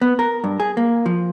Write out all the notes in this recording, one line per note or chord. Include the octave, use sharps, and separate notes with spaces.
B3
A#4
G2
G#4
A#3
F3